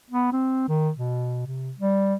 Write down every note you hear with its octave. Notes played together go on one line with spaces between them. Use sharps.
B3
C4
D#3
B2
C3
G3